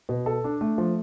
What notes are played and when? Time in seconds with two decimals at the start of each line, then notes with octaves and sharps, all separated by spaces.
0.09 B2
0.26 A4
0.44 D4
0.61 A3
0.78 F3